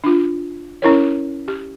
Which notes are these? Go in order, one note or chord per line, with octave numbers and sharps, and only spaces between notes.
D4 F4
C#4 E4 A#4 C#5
G4